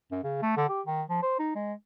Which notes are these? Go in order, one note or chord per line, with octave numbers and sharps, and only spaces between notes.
F#2
C#3
A3
D3
G4
D#3
F3
C5
D#4
G#3